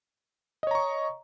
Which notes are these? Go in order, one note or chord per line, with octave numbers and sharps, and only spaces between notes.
C#5 D#5 A#5 C#6